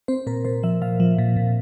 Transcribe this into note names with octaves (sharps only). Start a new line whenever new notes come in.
C4 C5
A#2 A#4
A#2 C5
F3 E5
A#2 F5
F3
A#2
A#2